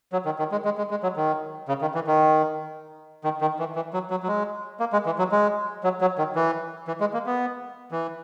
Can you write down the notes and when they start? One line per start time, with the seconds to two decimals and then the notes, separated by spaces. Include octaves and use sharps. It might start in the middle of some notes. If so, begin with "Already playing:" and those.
0.13 F#3
0.25 D#3
0.39 D#3
0.52 G#3
0.65 G#3
0.78 G#3
0.91 G#3
1.03 F#3
1.16 D#3
1.68 C#3
1.81 D#3
1.95 E3
2.07 D#3
3.24 D#3
3.41 D#3
3.59 E3
3.76 E3
3.94 F#3
4.11 F#3
4.23 F#3
4.28 G#3
4.80 A#3
4.93 G#3
5.06 E3
5.18 F#3
5.32 G#3
5.84 F#3
6.01 F#3
6.18 D#3
6.36 E3
6.88 E3
7.00 G#3
7.13 A#3
7.26 B3
7.91 E3